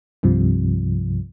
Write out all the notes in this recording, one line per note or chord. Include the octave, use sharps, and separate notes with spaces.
C2 G2 C3 F3